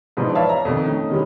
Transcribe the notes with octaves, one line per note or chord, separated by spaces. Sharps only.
G#2 B2 E3 F3 D4
B4 C#5 D5 E5 F5 A5
A#5
F2 B2 D#3
A3 C#4 D#4
D#3 E3 G3 G#3 B3 C#4